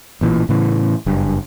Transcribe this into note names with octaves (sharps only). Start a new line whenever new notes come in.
A1 A#2 E3
A2 C#3 E3
F#1 G2